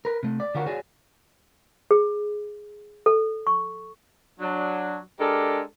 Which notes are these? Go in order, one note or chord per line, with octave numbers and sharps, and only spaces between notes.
A#4 B4
C3 A3
D5
D3 D4 F4 F#4 A#4 C#5
F#4 G#4 C#5 D5 G#5
G#4
A4
C#6
F#3 D4
G#3 D4 G4 A4 A#4